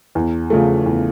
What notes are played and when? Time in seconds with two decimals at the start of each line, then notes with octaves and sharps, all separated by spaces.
0.15 E2
0.50 C#3 F3 A3
0.86 E2